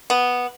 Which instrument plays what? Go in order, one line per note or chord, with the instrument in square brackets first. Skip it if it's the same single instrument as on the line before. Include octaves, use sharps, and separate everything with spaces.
[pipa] B3